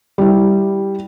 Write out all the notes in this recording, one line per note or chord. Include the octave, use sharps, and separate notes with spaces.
G3 E4